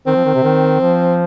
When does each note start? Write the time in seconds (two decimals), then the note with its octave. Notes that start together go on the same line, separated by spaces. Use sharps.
0.06 D#3 C4
0.16 F3
0.25 D#3
0.34 C3
0.43 D#3
0.80 F3